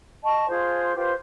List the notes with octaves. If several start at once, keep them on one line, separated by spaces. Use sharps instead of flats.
D#5 A5 C#6
F4 G#4 C5
F4 G4 B4 C5